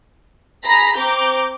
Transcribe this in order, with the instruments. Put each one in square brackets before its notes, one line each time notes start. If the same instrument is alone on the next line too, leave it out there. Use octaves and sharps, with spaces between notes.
[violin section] G#4 A#5 B5 A#6 B6
C4 A#5 D6 G6